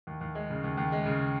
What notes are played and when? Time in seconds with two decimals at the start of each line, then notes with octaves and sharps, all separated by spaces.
0.07 D#2
0.21 D#2
0.35 G#3
0.50 C#3
0.64 D#2
0.77 D#2
0.92 G#3
1.06 C#3